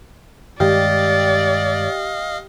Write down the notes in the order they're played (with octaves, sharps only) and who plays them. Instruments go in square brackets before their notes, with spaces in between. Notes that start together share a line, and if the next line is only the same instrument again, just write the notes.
[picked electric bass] G2 D#3 G#3 [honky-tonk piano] G4 [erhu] D5 [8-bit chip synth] D#5 F5